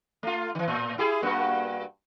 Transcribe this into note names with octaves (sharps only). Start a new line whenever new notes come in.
A3 F4
D#3 E3
A2
E4 G4 G#4
G2 A#3 F#4